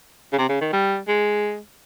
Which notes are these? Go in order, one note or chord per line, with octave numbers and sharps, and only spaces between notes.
C#3
C3
C#3
D#3
G3
G#3